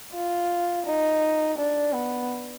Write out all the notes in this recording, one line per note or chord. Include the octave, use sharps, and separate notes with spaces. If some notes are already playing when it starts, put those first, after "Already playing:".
F4
D#4
D4
B3